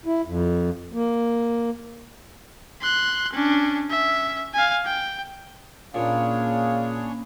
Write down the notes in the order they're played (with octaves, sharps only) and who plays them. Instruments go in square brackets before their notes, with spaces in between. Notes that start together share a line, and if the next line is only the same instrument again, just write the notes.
[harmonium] E4
F2
A#3
[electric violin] C6 F#6
C#4 D4
C#4 E5
F5 G#5
G5
[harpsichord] A#2 [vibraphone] A#3 C#4 B5 [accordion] D4 G#4 C#5 [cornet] F5